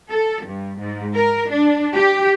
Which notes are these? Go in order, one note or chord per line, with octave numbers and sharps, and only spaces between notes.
A4
G2
G#2
A#4
D4
G4